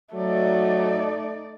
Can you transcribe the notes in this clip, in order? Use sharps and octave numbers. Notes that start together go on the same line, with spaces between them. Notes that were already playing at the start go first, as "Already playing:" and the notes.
F#3 A3 D#4 D5